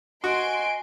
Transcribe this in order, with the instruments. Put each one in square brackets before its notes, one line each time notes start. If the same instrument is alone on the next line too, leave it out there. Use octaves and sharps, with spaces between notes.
[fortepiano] F#4 [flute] D#5 [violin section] G#5 C6 D7